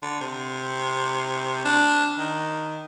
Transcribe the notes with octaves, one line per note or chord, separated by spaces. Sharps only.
D3
C3
D4
D#3